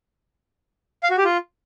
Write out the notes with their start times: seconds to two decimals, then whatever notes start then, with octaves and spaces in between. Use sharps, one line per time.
1.03 F5
1.10 F#4
1.17 G4
1.25 F4